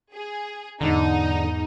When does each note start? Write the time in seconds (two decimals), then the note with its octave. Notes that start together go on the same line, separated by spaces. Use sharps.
0.12 G#4
0.81 E2 G#2 D3 D#4